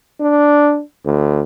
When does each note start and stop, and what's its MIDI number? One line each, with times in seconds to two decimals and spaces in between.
0.20 0.81 62
1.05 1.42 38